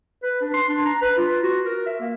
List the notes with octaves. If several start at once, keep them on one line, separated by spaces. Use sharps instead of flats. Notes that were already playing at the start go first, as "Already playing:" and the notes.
B4
D4
C6
D4
A#5
B4
F4
F#4
A#4
E5
A#3